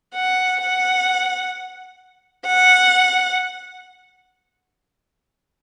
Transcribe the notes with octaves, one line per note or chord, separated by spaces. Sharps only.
F#5
F#5
F#5